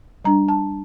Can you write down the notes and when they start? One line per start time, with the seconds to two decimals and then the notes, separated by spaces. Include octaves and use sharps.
0.25 G3 D4 A#5
0.48 A5